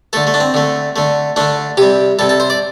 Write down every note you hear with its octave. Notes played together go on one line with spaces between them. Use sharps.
D3 A3 A4
A3
D4
C4
D3 A3
D3 A3
D3 A3 D4
C3 G3 G4
C3 G3 A4
A4
C5
D5